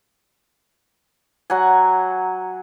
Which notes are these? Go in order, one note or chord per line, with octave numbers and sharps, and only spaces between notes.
F#3 F#5 G#5